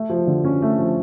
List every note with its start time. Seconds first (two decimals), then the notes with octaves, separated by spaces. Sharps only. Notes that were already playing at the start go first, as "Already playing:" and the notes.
Already playing: A3
0.10 F3
0.27 D3
0.44 C#4
0.62 A3
0.79 F3